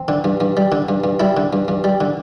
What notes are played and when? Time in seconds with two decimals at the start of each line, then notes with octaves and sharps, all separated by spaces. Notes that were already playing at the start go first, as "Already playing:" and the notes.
Already playing: C4
0.08 D3
0.24 G2
0.40 G2
0.57 G3
0.72 D3
0.89 G2
1.04 G2
1.20 G3 E4
1.37 D3
1.53 G2
1.68 G2
1.84 G3
2.01 D3